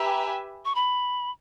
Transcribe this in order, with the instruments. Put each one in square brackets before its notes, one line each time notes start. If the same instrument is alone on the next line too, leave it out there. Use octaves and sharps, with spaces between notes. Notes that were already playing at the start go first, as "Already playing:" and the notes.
Already playing: [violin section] G4 B4 E5 G#5 [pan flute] A#5
[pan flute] C#6
B5